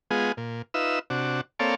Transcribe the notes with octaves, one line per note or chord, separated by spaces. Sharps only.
G#3 B3 F4 G#4
A#2
D#4 F4 B4 E5 E6
C3 D4 F#4
A#3 C4 A4 C#5 D5 F5